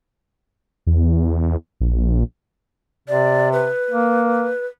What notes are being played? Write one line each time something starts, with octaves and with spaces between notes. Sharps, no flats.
E2
A#1
C3 D5
B4
A#3